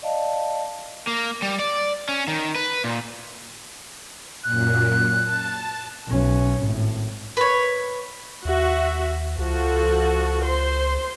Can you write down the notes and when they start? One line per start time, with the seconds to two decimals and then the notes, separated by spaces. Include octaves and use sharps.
0.02 D5 D#5 F5 A5
1.07 A#3
1.42 G3
1.59 D5
2.09 C#4
2.28 D#3
2.56 B4
2.84 A#2
4.44 F#2 A#2 F#6
5.22 A5
6.08 B1 C#4
6.62 G#1 A2
7.37 B4 C#5
8.45 D#2 F#4 E5
9.38 C#2 F3 F#4 A4
10.44 C5 C6